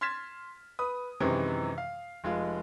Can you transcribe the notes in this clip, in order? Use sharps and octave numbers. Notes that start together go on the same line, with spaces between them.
C6 F6 G#6 A6 B6 E7
B4 D#6
F#2 C3 D#3 E3 G#3
F5
F1 G#3 F4